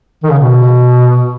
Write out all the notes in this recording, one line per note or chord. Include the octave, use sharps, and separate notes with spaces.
D#3
C#3
B2